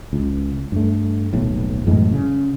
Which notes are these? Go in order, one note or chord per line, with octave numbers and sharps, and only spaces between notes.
C#2
G2 A3
D#1 B1 A2
F#2 A2 E3 G#3
C#3